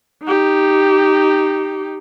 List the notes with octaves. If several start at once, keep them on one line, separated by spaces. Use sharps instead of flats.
D#4 G4